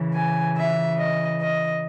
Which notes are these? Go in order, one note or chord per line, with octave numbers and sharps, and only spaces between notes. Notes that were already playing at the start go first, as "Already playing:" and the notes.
Already playing: C#3 E3
G#5
E5
D#5
D#5